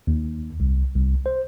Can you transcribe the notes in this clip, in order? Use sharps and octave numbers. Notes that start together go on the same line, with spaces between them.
D#2
C2
C2
C5